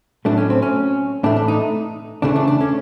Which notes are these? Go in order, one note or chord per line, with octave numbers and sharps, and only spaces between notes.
A2 F#3 A3 D4
C#4
C4
C#4
A2 E3 A3 D4
D4
D#4
E2 C#3 E3 A3 D4
D4
D4
C#4